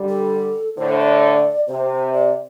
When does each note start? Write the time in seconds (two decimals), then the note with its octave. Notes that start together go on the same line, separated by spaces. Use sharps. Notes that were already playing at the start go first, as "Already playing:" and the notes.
Already playing: D3 G3
0.08 A4
0.77 A2 D3 C5
1.00 D5
1.68 C3 C5
2.13 D5